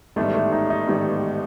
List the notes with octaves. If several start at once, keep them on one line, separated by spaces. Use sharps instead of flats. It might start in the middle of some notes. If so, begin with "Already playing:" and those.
A1 G#2 D#3 G3 A3 B3
A3
D#4
D#4
A1 G#2 D#3 G3 B3